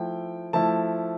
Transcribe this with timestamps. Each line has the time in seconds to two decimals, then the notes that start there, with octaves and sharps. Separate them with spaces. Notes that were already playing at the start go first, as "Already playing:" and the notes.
Already playing: F3 A3 E4 G5
0.53 F3 A3 E4 A5